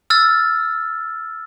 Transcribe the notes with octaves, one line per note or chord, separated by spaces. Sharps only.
E6 F6 A6